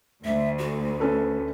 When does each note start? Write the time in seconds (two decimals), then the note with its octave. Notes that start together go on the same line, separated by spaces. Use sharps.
0.24 D2 E5
0.59 F#4
1.00 C#4 A4 B4